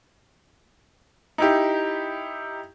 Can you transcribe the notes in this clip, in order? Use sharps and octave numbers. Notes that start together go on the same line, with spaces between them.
D#4 E4 G4